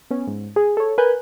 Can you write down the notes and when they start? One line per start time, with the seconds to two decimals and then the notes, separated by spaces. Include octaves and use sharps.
0.10 B3 C#4
0.27 G#2
0.56 G#4
0.77 A4 C#5
0.98 A#4 B4 G#5 F#6 G6